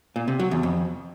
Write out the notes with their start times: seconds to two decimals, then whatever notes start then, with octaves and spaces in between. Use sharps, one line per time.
0.16 A#2
0.28 C3
0.39 F#3
0.51 E2
0.63 F2